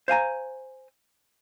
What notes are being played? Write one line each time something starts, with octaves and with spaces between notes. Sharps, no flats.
C5 F5 G#5 A#5